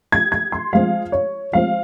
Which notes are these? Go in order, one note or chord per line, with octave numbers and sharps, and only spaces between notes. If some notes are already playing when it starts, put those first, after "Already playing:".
G#6
G#6
C6
F3 G#3 C4 F5
C#5
F3 G#3 C4 F5